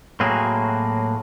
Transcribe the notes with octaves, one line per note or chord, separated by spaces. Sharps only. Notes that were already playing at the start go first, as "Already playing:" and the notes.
A2 F#3 A#3 C4 F#4 G#4